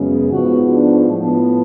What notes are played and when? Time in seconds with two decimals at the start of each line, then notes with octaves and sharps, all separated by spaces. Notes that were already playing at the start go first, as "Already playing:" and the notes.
Already playing: F#2 C#3 G#3 B3
0.31 G#2 F3 B3 F#4
0.71 D4
1.09 A2 F3 B3